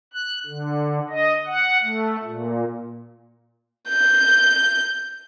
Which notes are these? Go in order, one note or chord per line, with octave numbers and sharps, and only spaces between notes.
F#6
D3
D#5
F#5
A3
A#2
G6